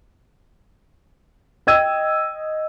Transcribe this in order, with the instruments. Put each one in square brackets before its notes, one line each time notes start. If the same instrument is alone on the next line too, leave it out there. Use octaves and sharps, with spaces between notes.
[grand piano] D#5 G5 E6 G#6 D#7